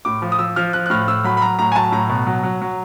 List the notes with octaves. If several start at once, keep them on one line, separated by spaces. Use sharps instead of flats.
A2 D6
F3
D#6
F3 E6
F3 F6
F3 F#6
F#6
A2 F6
A2 E6
F#3 B5
B5
F#3 A#5
A2 A#5
G#5
F#3 A5
A2 A#5
B2
F#3
F#3
F#3